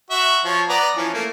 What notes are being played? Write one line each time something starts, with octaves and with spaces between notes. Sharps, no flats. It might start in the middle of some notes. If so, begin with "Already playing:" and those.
F#4 E5
F3 C#5
B3 D5 A#5
E3 F3 C#4
A3 A#3